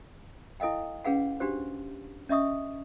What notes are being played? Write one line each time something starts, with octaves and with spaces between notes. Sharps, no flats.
E4 A4 D#5 F5 G5
C#4 G#4 B4 F5 F#5
D4 F#4 G4 C5
C#4 D#5 E5 C#6 D#6